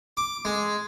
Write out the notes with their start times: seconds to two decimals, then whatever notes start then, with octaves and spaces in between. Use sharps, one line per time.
0.17 D6
0.45 G#3